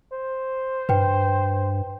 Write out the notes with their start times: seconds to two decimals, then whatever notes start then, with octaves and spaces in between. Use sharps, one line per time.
0.13 C5
0.89 G2 B4 G5